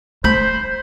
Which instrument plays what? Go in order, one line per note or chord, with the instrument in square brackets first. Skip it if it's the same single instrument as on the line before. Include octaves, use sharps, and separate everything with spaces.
[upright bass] A3 [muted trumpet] C5 [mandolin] B5 G6